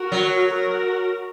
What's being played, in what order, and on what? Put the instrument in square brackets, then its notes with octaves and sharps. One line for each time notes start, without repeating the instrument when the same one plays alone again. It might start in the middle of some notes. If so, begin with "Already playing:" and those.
Already playing: [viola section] F#4 A#4
[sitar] F#3
[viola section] F#4 A#4